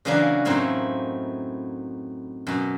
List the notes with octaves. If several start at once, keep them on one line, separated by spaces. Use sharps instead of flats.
C#3 E3 F#3 A#3 C#4 D4
F#2 A2 C4 D#4 E4 F5
F#2 B2